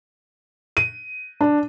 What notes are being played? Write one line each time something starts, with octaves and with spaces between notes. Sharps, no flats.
D#7
D4